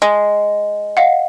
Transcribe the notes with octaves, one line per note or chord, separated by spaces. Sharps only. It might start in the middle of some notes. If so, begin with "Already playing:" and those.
G#3
D#5 F5 F#5